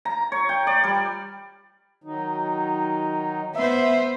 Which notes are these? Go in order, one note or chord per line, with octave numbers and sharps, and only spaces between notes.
A#5
C#5
G5
D5
G3
D#3 F#3 D#4
B3 C5 E5